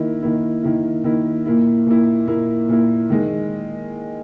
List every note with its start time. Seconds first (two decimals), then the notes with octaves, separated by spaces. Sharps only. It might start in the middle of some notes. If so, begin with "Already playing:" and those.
Already playing: D#3 A#3 E4
0.22 D#3 A#3 E4
0.63 D#3 A#3 E4
1.04 D#3 A#3 E4
1.46 A#2 A#3 E4
1.86 A#2 A#3 E4
2.27 A#2 A#3 E4
2.69 A#2 A#3 E4
3.10 D#3 G#3 D#4